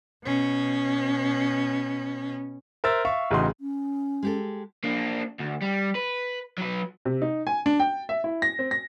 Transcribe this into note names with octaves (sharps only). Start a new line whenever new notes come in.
B2 C#4
A#4 C5 E5 E6 A6
E5 F5 C#6
A1 C#3 D#4 F#4 C6
C#4
G#3 G4 A4
A#3 D4
D2
G3
B4
F#3 B4
C3
D#4
G#5
D4
G5
E5
E4
A#6
C4
A#6